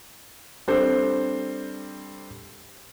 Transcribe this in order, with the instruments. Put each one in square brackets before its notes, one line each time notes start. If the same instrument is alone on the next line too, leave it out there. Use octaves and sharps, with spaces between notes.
[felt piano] G3 C4 D4 A4 C5